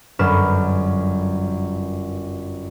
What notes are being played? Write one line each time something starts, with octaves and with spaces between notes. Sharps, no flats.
G1 F#2 B4 F6 E7